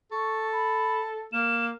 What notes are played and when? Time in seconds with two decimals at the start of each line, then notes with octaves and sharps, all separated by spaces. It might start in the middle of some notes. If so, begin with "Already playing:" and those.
0.11 A4 C#6
0.52 B5
1.33 A#3 E7